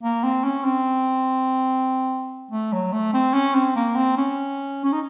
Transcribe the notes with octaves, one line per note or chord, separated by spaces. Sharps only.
A#3
C4
C#4
C4
A3
F#3
A3
C4
C#4
C4
A#3
C4
C#4
C#4
D#4